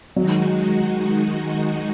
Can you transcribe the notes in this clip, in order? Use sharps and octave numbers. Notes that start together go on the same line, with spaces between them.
D#3 F#3 G#3 D#4 F#4